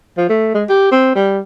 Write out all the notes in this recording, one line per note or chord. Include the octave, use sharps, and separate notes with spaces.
F3
A3
G#3
G4
C4
G3